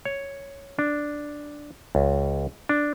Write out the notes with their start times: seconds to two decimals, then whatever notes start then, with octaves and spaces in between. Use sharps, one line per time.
0.05 C#5
0.79 D4
1.95 C#2
2.69 D4